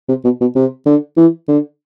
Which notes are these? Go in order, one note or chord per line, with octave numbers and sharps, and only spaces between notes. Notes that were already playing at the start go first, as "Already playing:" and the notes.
C3
B2
B2
C3
D3
E3
D3